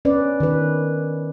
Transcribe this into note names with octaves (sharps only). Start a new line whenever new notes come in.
C#4 B4 D5
D#3 B4